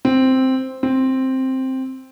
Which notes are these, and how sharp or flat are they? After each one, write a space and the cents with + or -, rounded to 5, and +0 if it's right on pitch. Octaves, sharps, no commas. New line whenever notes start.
C4 +0
C4 +5